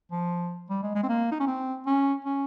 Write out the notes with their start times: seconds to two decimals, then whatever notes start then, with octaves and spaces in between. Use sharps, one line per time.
0.12 F3
0.70 G3
0.83 G#3
0.95 G#3
1.03 C4
1.09 A#3
1.32 D#4
1.40 C#4
1.47 C4
1.86 C#4
2.25 C#4